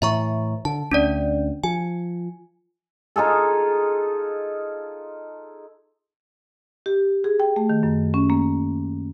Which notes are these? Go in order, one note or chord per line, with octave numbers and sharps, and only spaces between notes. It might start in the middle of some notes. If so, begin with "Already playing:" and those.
A2 E3 E5 A#5 C#6
D3 A5
D2 C#4 D4 D5
F3 G#5
D#4 F4 G#4 A4
G4
G#4
G5
A3
D#3
F#2
C#4
A#3